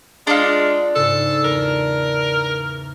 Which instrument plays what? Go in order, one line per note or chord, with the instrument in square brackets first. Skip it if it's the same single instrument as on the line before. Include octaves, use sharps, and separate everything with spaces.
[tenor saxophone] G#3 [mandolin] D4 F4
[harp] G#2 C#3 [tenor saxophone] A4
[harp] E2 [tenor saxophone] A#4